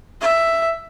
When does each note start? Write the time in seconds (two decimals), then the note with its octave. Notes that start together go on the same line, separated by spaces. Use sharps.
0.21 E5